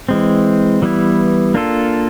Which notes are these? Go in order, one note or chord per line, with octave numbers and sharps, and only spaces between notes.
E3 G#3 C4
E3 G3 B3 E4
A#3 D4 F4 A4